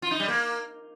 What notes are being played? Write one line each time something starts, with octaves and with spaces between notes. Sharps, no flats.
F4
D#4
G3
A#3